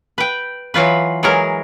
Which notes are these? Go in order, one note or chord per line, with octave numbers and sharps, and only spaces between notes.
B4 G5
E3 F#3 F4 B4
E3 F#3 G#3 G#4 A#4